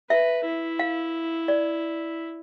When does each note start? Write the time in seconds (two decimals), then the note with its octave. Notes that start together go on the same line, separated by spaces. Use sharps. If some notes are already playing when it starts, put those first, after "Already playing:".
0.10 B4 E5
0.45 E4
0.79 F5
1.48 D5